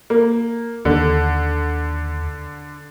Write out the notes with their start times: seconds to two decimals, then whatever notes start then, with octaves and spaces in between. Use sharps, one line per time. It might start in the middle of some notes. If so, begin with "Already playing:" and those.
0.10 A#3
0.85 D#2 D3